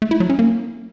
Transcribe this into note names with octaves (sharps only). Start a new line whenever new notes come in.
A3
E4
F#3
C#4
A#3